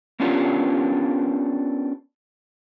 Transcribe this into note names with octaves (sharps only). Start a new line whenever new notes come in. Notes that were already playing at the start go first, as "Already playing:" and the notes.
B3 C#4 D4 F4 G4 A#4